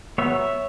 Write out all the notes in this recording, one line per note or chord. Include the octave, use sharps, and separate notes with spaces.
F#3 B3 C#5 E5